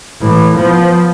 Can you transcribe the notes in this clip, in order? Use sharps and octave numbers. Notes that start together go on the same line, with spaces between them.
A2 E3
F3 B3